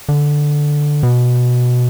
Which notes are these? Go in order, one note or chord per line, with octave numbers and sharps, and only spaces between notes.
D3
B2